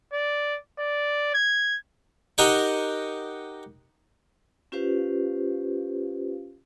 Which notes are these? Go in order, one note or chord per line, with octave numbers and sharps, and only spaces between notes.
D5
D5
G#6
D#4 G4 A#4 D#5 F#5 G5
C#4 F4 G4 B4 C5 F5